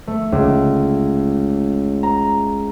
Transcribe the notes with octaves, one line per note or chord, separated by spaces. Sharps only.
A3
C#2
A#5